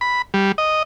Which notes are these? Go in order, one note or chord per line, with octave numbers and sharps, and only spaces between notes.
B5
G3
D#5